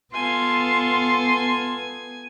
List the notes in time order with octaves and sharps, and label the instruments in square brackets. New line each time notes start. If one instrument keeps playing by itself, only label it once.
[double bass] B3 [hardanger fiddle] F4 A4 [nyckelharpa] G#5 [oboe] C6